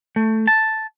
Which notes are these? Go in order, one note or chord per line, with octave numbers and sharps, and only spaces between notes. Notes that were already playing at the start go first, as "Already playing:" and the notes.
A3
A5